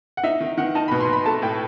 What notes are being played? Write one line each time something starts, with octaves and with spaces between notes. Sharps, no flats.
F#5
D#4 E5
D#3
D#3 F#5
D#4 A5
B5
B2
C6
B2 B5
A3 A5
A2 G5